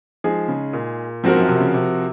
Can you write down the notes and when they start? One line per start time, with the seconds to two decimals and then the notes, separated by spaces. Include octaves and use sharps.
0.24 F3 G#3 D#4 G#4
0.48 C#3
0.73 A#2
1.24 G#2 F3 C4 F#4 A#4
1.36 F#2
1.48 C3
1.60 C#3
1.74 C3